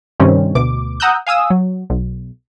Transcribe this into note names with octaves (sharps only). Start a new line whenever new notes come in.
G2 C3 D#3 G3 C4 C#4
D2 B2 D6
F#5 A#5 D#6 E6 F#6 G6
F5 G#5 D#6 E6
F#3
B1